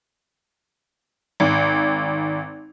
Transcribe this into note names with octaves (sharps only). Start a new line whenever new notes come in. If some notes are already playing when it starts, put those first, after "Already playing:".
G#1